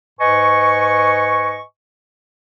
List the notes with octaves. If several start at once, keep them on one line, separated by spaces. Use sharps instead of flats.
G#2 B4 D#5 G#5 C#6